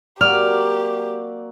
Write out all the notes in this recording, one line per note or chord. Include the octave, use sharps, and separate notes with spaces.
F#3 A#3 C4 G4 D5 F6